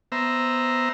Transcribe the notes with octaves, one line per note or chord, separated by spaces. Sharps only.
B3 C5 E5 A#5